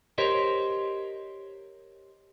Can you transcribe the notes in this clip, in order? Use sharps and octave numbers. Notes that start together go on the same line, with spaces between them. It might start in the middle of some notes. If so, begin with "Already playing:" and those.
G4 A#4 C5 C#5 D#5